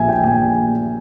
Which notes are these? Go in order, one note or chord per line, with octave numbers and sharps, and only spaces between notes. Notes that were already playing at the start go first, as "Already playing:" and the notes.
Already playing: A#1 A#2 F3 E5 G#5
G5
A#1 A#2 F3 G#5